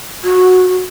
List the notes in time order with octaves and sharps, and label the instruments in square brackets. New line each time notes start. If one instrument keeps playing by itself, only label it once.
[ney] F#4